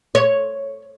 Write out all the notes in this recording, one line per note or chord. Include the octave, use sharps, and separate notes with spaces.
C#5